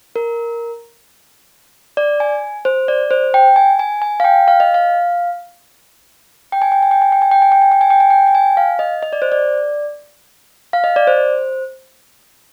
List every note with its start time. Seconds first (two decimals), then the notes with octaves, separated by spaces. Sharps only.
0.16 A#4
1.97 D5
2.20 G#5
2.65 C5
2.88 D5
3.11 C5
3.34 G5
3.56 G#5
3.79 G#5
4.02 G#5
4.20 F5
4.24 G5
4.48 F5
4.60 D#5
4.74 F5
6.52 G5
6.62 G#5
6.72 G5
6.83 G#5
6.91 G5
7.02 G#5
7.12 G5
7.22 G#5
7.31 G5
7.42 G#5
7.52 G5
7.62 G#5
7.72 G5
7.81 G#5
7.90 G5
8.00 G#5
8.10 G5
8.27 G5
8.35 G#5
8.57 F5
8.79 D#5
9.03 D#5
9.13 D5
9.22 C5
9.32 D5
10.73 F5
10.84 D#5
10.96 D5
11.07 C5